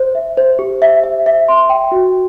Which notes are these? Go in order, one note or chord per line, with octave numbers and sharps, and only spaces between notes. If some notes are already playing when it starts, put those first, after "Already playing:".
Already playing: C5
E5
C5
G4
E5
E5
E5
C6
G5
F#4